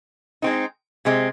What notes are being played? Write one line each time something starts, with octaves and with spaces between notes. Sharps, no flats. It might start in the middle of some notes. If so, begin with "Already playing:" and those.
G#3 C4 D#4
C3 G#3 C4